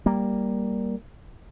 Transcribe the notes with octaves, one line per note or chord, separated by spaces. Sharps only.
G3 A#3